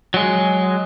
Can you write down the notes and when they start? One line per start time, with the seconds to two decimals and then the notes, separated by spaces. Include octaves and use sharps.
0.14 F#3 G#3